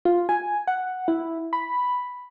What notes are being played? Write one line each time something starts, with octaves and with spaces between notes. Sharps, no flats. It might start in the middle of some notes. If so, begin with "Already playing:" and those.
F4
G#5
F#5
E4
B5